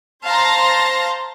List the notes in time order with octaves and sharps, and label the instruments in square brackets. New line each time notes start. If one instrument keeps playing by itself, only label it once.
[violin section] C5 F5 A5 A#5 C6 A#6